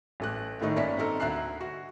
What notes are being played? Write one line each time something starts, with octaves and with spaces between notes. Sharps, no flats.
A1 A3 F#6
A2 D#3 A3 D#4
G1 A#3 C#4 D5 E5 B6
C4 D#4 A4 A#4
D2 E5 A#5 F#6 C7
F#4